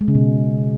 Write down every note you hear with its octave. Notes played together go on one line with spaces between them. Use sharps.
G#3
C#3
B2